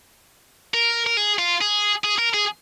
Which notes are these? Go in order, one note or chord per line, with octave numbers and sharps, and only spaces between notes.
A#4
A#4
G#4
F4
G#4
G#4
A#4
G#4